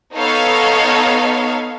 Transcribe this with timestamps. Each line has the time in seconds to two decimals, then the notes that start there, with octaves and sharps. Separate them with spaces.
0.15 B3 D#4 A4 C#5 F5